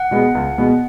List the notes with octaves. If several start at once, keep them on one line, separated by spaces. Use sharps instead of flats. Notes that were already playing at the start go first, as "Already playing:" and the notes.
Already playing: F#5
B2 G#3 B3
C#2
B2 G#3 B3